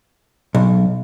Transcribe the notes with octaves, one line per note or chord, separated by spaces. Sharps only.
B1